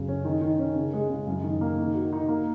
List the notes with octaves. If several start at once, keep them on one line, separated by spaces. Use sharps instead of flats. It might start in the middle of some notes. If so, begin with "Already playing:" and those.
Already playing: F#2 C#3
C#4
D#3
D#3
C#4
C#3
G#3
C#3
F#2
D#3
A#3
D#3
F#4
D#4
A#3